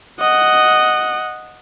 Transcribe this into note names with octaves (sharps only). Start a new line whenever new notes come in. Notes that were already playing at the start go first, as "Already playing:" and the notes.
D#5 F#5